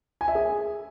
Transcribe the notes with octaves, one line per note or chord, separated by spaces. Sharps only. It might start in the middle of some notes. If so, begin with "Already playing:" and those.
G#5
E5
G#4